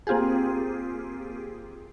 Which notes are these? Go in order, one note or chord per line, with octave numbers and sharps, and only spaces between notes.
A#3 C4 F4 G4 G#4